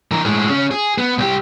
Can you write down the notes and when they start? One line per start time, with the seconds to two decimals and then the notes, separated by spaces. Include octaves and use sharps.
0.11 E3 A#4
0.25 A2 G#3
0.49 C#3 C#4
0.71 G#4
0.98 B3
1.18 C2 G4